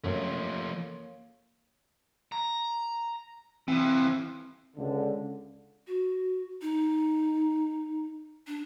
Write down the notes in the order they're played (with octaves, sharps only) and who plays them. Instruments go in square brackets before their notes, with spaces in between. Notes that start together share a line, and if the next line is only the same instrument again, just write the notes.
[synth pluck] F#2 [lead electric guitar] F3 A3 [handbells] A#3 C#5
[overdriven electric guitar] A#5
[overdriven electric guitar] E3 F3 [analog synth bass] C4
[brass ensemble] C#2 D3
[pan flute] F#4
D#4
D4